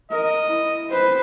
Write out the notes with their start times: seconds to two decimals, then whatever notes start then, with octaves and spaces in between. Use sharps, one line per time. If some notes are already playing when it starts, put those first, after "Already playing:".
0.12 A#4 D#5
0.48 E4
0.90 B4 C5